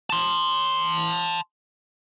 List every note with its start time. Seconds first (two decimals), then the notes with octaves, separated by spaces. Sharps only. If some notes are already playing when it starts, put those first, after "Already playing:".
0.10 A5 C6